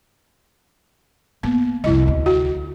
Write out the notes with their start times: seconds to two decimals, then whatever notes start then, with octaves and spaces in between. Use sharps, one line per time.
1.43 A#3 B3
1.84 C2 F2 E4 D#5
2.08 D2
2.26 F#4